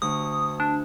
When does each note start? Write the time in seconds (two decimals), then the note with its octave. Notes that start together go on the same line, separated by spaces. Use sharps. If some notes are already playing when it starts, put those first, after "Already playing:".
0.02 D2 D#6
0.60 D4